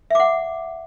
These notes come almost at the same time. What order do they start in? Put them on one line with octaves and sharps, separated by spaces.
E5 D6 F#5